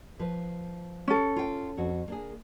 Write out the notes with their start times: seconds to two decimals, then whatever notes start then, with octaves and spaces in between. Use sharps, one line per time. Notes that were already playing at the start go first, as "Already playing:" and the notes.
0.19 F3 B4
1.08 C#4 A4
1.36 F4 G5
1.77 F2 F#4
2.08 A#3 D4 G#4